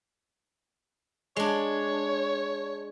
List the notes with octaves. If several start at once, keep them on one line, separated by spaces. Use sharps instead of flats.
G#3 D4 C#5